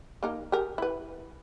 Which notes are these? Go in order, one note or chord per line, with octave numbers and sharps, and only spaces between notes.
A#3 D#4 A#4
G4 G#4 A#4
E4 B4